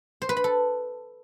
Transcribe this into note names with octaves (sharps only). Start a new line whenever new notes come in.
C5
B4
B5
A4